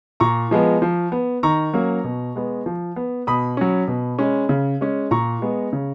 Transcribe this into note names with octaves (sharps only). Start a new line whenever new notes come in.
A#2 A#5 C#6
F3 G#3 B3
F3
B3
D#3 A#5 C#6
F#3 A#3 C#4
B2
G#3 B3
F3
B3
B2 B5 D#6
F#3 C#4
B2
G#3 C#4
C#3
G#3 C#4
A#2 A#5 C#6
G#3 B3
C#3